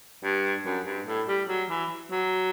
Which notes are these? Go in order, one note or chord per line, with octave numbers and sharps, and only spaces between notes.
G2
F#2
G2
A2
G3
F#3
E3
F#3